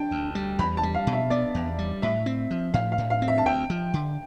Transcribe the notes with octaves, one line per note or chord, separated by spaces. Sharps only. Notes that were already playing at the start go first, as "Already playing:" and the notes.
Already playing: D4 G5 A5
D2
G3
E2 B5
A5
G3
F5
B2
E5
B3 D5
E2
G3
A2 E5
C4
F3
A2 F5
F5
A2
F5
C4
E5
A5
D2 G5
F3
D3